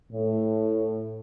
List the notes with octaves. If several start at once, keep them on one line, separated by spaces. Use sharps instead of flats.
A2